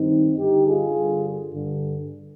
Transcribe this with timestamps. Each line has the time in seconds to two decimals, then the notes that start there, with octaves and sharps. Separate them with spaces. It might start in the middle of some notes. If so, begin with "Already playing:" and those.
Already playing: G2 D#3 C4 D#4
0.39 G2 D3 D#4 G4
0.67 F4 G#4
0.95 G2 D3
1.52 G2 D3